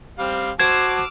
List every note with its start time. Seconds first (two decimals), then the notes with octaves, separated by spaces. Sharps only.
0.19 G3 C4 F5
0.60 F#4 C5 A5 D6 E6 F6 G#6